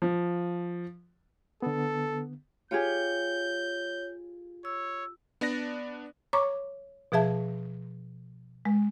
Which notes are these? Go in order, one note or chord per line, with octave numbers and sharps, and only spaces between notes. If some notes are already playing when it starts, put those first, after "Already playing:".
F3
D3 B3 A4
F4 G4 G#4 C#5 G6
C#5 E6
B3 D4 D5 A#6
C#5 A#5 C#6 D6
B2 F3 G#4 E5 A5
G#3